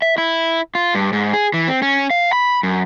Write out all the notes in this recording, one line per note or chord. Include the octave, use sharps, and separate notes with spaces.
E5
E4
F4
G2
G#2
G#4
E3
C4
C#4
F5
B5
F#2